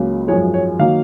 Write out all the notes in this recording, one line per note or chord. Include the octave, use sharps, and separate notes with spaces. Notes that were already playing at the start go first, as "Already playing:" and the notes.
Already playing: C#2 C#3 F#3 A#3
G#1 F#2 F3 G#3 C#5
C#5
D#3 F#3 A#3 F5